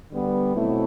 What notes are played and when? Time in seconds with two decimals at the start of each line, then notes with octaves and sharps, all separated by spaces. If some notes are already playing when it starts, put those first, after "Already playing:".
0.11 D3 G3 B3
0.54 B2 F#3 A3 C4 E4